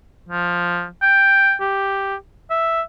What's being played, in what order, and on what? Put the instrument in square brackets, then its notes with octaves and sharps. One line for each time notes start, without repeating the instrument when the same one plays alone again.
[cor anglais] F3
G5
G4
E5